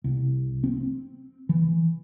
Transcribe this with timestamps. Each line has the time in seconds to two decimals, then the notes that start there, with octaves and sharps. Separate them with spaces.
0.04 C2
0.64 C4
1.49 E3